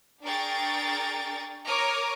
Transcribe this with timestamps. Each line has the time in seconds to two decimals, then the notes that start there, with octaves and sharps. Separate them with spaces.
0.24 D4 G#4 A#4 G5 C#6 A6
1.64 A#4 C#5 A#5 D6 D#6 F6